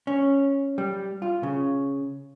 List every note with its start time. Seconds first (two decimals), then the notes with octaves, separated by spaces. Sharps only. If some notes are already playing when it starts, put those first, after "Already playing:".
0.07 C#4
0.78 G3
1.22 F4
1.43 C#3